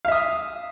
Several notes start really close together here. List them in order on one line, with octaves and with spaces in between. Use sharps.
F5 E5 D#6